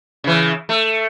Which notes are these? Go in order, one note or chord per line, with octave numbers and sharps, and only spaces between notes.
C#3 E3
A3